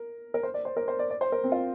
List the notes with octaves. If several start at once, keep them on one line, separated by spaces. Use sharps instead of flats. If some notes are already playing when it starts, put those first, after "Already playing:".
Already playing: A#4
A#4
C5
D5
C5
A#4
C5
D5
D5
C5
A#4
C4
F4